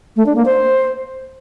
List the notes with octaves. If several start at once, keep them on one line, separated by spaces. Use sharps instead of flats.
A3
D4
A#3
C5